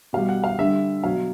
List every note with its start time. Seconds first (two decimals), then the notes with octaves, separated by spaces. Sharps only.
0.13 B2 G3 F5
0.29 F#5
0.44 F5
0.58 D3 G3 E5
1.03 B2 F#3 F5